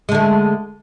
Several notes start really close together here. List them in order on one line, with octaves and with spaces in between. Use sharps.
G#3 D3 A3